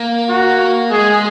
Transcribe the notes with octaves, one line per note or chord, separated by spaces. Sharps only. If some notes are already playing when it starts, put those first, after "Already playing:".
Already playing: A#3
F#4
G#3 G#4